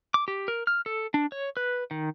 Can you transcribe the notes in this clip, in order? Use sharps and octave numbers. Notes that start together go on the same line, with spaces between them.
D6
G4
A#4
F6
A4
D4
C#5
B4
D#3